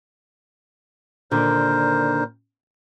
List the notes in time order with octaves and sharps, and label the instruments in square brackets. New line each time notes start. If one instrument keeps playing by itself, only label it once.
[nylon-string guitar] A#2 D3 D#3 [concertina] A#4 C5